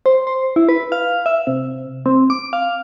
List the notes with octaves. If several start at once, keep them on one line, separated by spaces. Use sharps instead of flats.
C5
C5
E4
B4
F5
E5
C3
C4
D6
F5